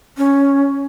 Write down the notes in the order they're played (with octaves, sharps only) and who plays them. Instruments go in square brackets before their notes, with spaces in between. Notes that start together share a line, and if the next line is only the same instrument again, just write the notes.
[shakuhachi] C#4